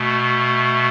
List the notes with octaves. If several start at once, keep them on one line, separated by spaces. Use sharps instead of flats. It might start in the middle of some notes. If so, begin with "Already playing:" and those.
Already playing: B2 A3